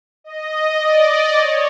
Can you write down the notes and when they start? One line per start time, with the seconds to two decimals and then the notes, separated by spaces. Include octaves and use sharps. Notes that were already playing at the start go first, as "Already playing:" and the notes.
0.24 D#5
0.78 D5
1.34 C#5